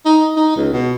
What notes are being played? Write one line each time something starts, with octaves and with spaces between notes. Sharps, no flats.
D#4
D#4
C#2
B2